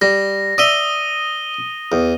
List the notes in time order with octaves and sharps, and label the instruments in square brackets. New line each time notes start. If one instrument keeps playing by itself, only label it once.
[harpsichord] G3 [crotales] A#6
[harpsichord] D5 E5 [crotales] D#6 D#7 G7
[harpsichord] E2